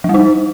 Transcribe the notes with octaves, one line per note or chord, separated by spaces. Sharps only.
F3
G3
D#4